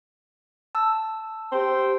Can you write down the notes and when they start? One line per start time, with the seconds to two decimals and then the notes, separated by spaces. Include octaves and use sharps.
0.75 A5 E6
1.52 G4 C5 G5